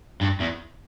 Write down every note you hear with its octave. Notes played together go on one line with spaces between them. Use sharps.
G2
E2